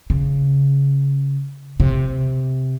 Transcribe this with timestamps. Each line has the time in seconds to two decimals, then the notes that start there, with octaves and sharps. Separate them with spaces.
0.10 C#3
1.80 C3